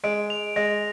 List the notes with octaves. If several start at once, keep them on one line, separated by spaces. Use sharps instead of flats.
G#3 D7
F7
G#3 A#6